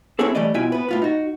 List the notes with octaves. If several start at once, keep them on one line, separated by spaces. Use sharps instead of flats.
C4 C#4 E4 F#4 G#4 A4
E3 G3 A3 D5 D#5
B2 E4 F4 E5 G5 G#5
B3 B4
A2 F4 B4
D#4 F#4